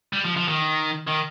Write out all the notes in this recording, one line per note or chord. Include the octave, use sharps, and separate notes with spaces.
G3
F3
F3
D#3
D#3